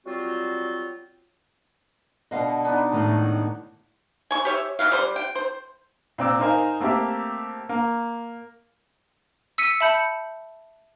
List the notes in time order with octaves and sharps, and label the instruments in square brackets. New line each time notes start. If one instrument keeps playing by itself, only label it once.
[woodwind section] F#3 G3 C4 F4 F#4
[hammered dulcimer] B2 D3 B3 [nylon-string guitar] D#5 F5
[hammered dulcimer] B3 D4 D#4
[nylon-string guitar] A2 D#3 G#3 [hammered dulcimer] A3 F#4
[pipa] G#5 C#6
G4 C#5 E5
E3 F#3 F5
G3 C5
G5
C5
[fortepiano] A#2 C4 D6 E6
D#4 A#4 C5 F5 G#5
A3 A#3 C4 G4 E5
A#3
[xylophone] E6 B6 C#7 D#7
E5 A5 B5 G6 C#7